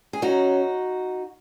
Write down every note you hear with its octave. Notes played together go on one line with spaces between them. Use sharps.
G#4
F#2 C#3 F#3 C#4 D#4 F#4